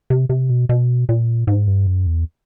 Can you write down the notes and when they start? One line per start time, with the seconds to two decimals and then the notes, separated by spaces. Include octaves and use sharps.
0.10 C3
0.29 C3
0.49 B2
0.69 B2
1.09 A#2
1.47 G#2
1.67 G2
1.87 F#2
2.07 E2